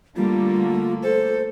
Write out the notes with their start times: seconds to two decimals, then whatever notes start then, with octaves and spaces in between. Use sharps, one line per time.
0.16 D3 G3 A3 A#3 F4
1.03 A4 C5